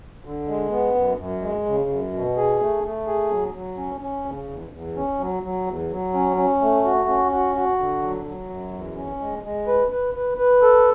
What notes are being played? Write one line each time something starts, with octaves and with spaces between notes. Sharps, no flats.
D3
G#3
B3
F#2
F#2
G#3
C#3
F#2
B2
G#4
A3
A3
G#4
F#3
F#3
C#4
C#4
C#3
E2
E2
C#4
F#3
F#3
E2
F#3
C#4
C#4
A3
F#4
C#4
F#4
F#4
D3
F#3
F#3
F#2
E2
C#4
G#3
G#3
B4
B4
B4
B4
A4